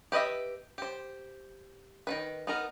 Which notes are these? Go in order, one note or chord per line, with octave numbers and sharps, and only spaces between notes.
G4 B4 D#5 E5
G4 C5
D#3 E3 B4
B3 D#4 A#4